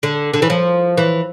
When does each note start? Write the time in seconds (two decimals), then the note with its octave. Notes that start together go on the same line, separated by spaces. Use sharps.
0.03 D3
0.34 D3
0.42 E3
0.50 F3
0.97 E3